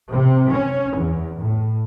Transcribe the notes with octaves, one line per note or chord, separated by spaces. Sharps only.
C3
C#4
E2
A2